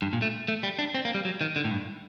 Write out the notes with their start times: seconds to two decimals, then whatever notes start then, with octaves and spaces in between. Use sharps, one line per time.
0.02 G2
0.13 A#2
0.22 A3
0.48 A3
0.63 G3
0.79 D4
0.94 C4
1.05 A#3
1.14 G3
1.25 F#3
1.41 D#3
1.56 D3
1.64 A2
1.71 G2